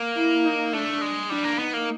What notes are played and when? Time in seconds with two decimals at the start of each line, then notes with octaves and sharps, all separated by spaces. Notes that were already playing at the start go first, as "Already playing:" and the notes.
Already playing: A#3
0.16 E4
0.45 D#4
0.73 A3 D4
1.01 G#3
1.30 G3 D4
1.44 A#3
1.59 B3 D#4
1.73 A#3